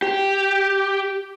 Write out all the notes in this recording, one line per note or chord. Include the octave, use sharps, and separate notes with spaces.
G4